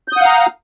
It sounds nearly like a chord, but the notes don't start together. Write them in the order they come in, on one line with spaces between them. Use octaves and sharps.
G6 D#6 F#5 F5 A#5